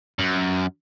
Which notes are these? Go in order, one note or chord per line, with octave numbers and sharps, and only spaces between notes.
F#2